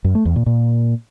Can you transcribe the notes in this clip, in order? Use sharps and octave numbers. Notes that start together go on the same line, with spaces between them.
F#2
A3
E2
A#2
A#2